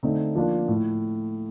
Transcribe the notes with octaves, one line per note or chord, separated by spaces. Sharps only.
D3 A3 C4 D#4
F3 A#3 D4 F4
A2